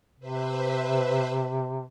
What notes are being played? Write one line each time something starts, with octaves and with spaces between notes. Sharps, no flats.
C3 B4 C5 E5